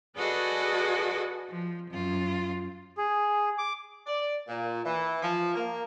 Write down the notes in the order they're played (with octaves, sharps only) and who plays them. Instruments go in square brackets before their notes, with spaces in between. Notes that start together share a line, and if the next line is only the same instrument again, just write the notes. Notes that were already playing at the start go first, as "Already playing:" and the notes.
[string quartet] F#4 G#4 A4 B4 D5 D#5
F3
F#2 F4
[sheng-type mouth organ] G#4
D6
[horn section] D5
A#2
E3
F3
A#3